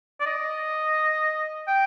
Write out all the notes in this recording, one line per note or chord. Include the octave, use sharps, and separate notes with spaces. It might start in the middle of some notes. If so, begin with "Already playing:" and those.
D5
D#5
G5